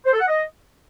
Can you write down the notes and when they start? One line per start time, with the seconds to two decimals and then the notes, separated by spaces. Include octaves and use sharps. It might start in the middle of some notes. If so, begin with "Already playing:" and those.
0.05 C5
0.13 A4
0.21 F#5
0.28 D#5